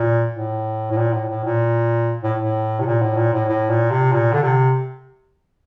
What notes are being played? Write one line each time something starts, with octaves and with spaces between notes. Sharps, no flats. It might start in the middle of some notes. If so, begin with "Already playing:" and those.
Already playing: A#2
A2
A2
A#2
A2
A2
A#2
A2
A2
C3
A#2
A2
A#2
A2
A2
A#2
C3
A#2
D3
C3